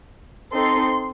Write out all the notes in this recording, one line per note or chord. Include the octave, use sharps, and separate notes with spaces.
C4 D#4 A4 C6